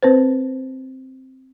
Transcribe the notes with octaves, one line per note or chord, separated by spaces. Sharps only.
C4 B4 C5